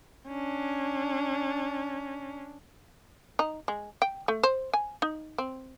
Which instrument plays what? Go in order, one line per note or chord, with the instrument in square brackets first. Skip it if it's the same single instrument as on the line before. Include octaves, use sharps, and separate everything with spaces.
[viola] C#4 D4
[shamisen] D#4
G#3
G5
A3
C5
G#5
D#4
C4